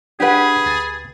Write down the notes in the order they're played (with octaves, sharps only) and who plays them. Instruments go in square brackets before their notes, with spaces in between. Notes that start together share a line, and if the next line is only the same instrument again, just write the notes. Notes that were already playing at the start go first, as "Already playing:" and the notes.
[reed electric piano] D4 F#5 [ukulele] G4 B4 [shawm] G#4
[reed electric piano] D2 A6